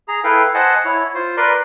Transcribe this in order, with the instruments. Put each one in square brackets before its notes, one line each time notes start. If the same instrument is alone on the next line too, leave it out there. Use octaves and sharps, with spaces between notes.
[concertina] G#4 A#5
E4 A4 B4 F5 G5
C5 D#5 F#5 G#5 A5
E4 C#5
F4 C5
A#4 B4 D5 C6